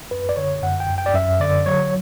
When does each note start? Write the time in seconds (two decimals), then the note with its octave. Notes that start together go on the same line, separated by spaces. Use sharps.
0.11 F#2 B4
0.29 D5
0.36 D3 C#5
0.62 F#2 F#5
0.80 G5
0.89 F#2
0.98 G5
1.06 D5
1.14 F#2 E5
1.40 D3 D5
1.66 F#3 C#5